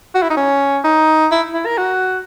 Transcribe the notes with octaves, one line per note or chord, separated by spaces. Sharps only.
F#4
E4
D#4
C#4
D#4
E4
E4
A#4
F#4